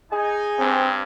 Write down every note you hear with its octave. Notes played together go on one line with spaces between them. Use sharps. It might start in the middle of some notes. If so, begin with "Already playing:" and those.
D#4 G#4 G#5
G2 C4